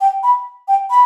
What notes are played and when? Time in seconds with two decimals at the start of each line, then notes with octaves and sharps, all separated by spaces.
0.01 G5
0.23 B5
0.68 G5
0.90 B5